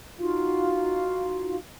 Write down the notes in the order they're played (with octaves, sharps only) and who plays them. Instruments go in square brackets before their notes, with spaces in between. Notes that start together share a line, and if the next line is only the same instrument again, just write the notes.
[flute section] D#4 F4 F#4 F5